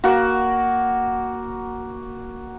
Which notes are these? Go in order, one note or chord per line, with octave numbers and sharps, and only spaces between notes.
A#3 F#4